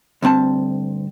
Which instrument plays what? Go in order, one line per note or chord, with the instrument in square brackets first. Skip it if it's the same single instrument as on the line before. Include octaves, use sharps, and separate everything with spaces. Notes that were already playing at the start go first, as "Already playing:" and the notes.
[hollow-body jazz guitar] D2 G2 C4 A5